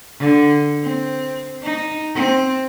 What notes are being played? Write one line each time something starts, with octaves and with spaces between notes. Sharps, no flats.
D3
C4
D#4
C4